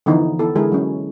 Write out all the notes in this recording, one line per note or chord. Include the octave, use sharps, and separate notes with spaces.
D3 E3 F3 B3 D#4
B3 E4 A4
D3 G#3 E4 G#4 A#4
F#3 C#4